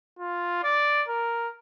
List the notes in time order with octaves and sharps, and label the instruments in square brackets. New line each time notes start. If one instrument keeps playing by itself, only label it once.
[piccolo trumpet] F4
D5
A#4